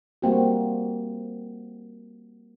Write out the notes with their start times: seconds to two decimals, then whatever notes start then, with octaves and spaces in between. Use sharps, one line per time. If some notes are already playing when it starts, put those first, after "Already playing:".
0.22 G3 A#3 C4 F#4